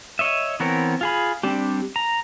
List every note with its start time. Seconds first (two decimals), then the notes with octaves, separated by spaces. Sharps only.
0.19 C#5 D#5 E5
0.60 E3 B3 C4 A#4 C#5
1.01 F4 G#4 B5
1.43 G3 C4 D4 G4
1.96 A#5